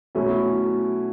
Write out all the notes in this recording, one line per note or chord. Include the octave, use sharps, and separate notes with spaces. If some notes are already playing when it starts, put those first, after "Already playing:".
B2 F#3 A3 C#4 E4